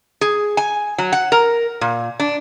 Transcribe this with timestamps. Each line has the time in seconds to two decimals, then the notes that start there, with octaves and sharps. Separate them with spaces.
0.21 G#4
0.57 G#5
0.98 F#3
1.12 F#5
1.32 A#4
1.81 A#2
2.20 D4